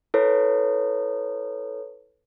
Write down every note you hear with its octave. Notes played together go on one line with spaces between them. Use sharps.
E4 A4 B4 C#5